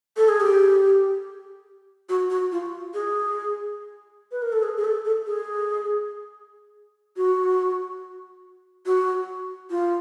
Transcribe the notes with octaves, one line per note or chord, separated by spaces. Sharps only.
A4
G#4
G4
F#4
F#4
F4
G#4
B4
A#4
A4
G#4
G#4
A4
A4
G#4
F#4
F#4
F4